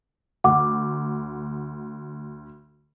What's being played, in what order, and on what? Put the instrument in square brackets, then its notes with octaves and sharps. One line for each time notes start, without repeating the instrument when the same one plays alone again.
[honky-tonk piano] D2 [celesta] F#5 D6